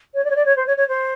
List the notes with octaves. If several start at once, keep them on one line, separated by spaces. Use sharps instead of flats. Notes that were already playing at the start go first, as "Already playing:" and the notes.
C#5
D5
C#5
D5
C#5
C5
C#5
C#5
C5